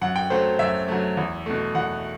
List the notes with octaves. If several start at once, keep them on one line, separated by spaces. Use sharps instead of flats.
F#2 F#5
G5
F#3 A3 C5
F#2 E5
F#3 A3
E2
B2 A3
E2 F#5